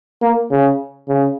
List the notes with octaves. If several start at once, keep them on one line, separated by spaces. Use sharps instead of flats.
A#3
C#3
C#3